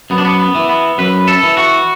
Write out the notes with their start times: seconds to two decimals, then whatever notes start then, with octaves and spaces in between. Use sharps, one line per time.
0.10 F#2 B3
0.18 D4
0.25 B3
0.39 B3
0.55 E3
0.69 B3
0.98 F#2 B4
1.28 A4
1.43 E3
1.57 F#4